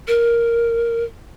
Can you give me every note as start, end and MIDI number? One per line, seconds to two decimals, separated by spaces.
0.08 1.03 70